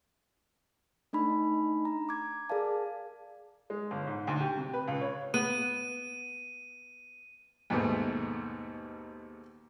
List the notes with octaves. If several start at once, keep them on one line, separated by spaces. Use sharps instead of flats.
A3 D4 D#4 B5
A#5
D6 G#6
G#4 A#4 D5 F5 A5
G#3
G1
G#2
D2
G4
C3
B4
C#2
C#5
B3 D#7
D#2 G#2 B2 A3 B3